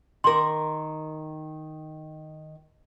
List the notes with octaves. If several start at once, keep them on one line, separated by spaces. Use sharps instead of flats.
D#3 A#4 C6 D6